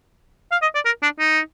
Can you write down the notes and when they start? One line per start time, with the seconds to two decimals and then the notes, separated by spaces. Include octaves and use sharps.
0.51 F5
0.62 D#5
0.74 D5
0.85 A#4
1.02 D4
1.19 D#4